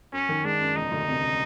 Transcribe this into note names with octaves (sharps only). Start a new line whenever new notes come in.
F#2 C#4
D#3
G#3 D4
F#2
E1 D#4
D2
C3